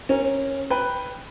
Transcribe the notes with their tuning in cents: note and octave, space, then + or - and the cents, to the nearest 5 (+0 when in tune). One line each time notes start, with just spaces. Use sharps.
C#4 -20 A#4 +0
B4 +0 G5 +0